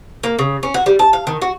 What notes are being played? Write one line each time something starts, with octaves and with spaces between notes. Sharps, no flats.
A#3
C#3
C#4
F#4
G3
A5
F5
D#3
F#4